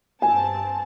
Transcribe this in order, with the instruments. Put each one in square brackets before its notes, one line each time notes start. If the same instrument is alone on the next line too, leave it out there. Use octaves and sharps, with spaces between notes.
[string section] G2 C4 A5 [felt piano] G#5